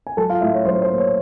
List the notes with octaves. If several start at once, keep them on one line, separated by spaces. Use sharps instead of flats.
G#5
F#3 A4 A5
F4 F5
A2 E4 E5
C#5
F#3 C5
C5
A#3
C#5